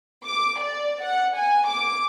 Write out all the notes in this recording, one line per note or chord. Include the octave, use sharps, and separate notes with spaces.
D6
D5
F#5
G#5
D6